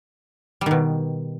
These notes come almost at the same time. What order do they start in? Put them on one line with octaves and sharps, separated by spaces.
G3 D#3 B2